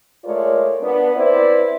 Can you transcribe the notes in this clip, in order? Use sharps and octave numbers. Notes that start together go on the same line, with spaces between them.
G#3 A3 F4 A#4 C#5 D5
B3 D4
C4 E4 B4 C5 D5